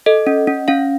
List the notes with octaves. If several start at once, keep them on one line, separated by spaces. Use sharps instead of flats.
A4 D#5
C#4
C#4
C#4 F5